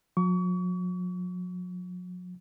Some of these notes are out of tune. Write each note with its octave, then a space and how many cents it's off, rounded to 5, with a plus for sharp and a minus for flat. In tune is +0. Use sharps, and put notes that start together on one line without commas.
F#3 -45 C#6 +35